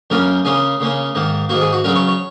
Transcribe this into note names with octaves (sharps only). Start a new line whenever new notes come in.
F#2 C#3 A#3 C#4 A#4
C#3 A#3 C#4 G#4
C#3 A#3 C#4
G#2 D#3 A#3
G#2 D#3 A#3 F#4
G#4
F#4
C#3 F#3 C#4 A#4
C#5
C#5